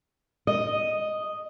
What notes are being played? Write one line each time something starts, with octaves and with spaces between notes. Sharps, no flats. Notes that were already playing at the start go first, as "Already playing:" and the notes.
D#5